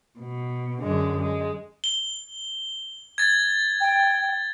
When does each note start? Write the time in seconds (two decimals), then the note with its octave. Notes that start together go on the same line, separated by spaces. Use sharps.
0.19 B2
0.82 F#2 D3 G#3
1.21 G#3
1.84 G7
3.18 G#6 A6
3.81 G5